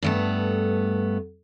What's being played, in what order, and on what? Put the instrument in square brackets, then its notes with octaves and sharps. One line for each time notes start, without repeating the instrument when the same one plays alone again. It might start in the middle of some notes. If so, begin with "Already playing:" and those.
[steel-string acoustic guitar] G2 A3 B3